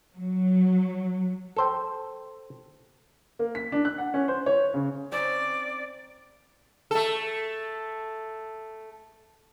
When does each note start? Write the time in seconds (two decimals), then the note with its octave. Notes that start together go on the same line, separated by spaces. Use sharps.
0.15 F#3
1.57 A4 C5 G5
3.39 A#3
3.55 B6
3.72 D4
3.85 F#6
3.98 F#5
4.14 C#4
4.28 C5
4.46 C#5
4.74 C#3
5.12 C4 C#4 D#4 D5
6.91 A3 A4